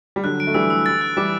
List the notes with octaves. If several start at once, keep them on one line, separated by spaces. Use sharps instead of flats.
G3
D3 F#3 F#6
D7
A3
E3 G3 E6
E6
A6
F#6
E3 G3 D6